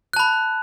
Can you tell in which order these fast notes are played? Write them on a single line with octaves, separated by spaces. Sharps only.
F#6 A5 B5